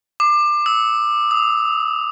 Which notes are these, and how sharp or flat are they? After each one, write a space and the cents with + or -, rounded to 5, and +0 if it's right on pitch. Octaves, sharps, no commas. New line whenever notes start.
D6 +25
E6 -20
D#6 +30